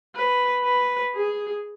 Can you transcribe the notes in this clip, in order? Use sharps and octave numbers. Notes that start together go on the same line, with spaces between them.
B4
B4
G#4